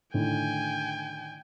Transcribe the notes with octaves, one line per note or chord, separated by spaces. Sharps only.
A2 D3 D#3 G5 G#5